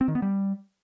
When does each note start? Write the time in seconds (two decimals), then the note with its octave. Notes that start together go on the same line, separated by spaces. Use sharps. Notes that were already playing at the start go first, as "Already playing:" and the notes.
0.01 C4
0.08 D#3
0.15 B3
0.22 G3